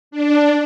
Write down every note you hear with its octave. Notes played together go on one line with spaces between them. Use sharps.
D4